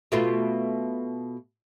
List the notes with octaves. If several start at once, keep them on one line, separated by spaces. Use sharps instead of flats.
B2 A3 F4